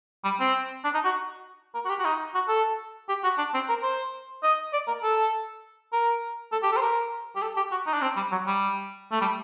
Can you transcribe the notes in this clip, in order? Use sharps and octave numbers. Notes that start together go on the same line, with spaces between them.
G3
C4
D4
D#4
F#4
A#4
F#4
G4
F#4
D#4
F#4
A4
G4
F#4
D4
C4
A#4
C5
D#5
D5
A#4
A4
A#4
A4
G4
A4
C5
A#4
G4
A4
G4
F#4
D#4
D4
C4
G3
F#3
G3
A3
G3